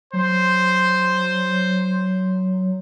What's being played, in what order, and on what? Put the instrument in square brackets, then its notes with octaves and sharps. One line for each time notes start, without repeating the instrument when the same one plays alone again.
[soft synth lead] F#3 [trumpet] C5